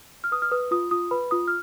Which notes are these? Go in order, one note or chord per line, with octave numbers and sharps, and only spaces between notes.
F6
B4 D#6
F6
B4 D#6
F4 D#6
F4 D#6
B4 B5
F4 D#6
F6